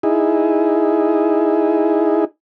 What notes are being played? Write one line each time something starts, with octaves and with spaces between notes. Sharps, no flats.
D#4 E4 G#4